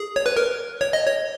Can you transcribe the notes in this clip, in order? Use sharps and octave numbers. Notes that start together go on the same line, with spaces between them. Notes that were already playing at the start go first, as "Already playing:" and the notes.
Already playing: G#4
C#5
B4
A#4
C#5
D#5
C#5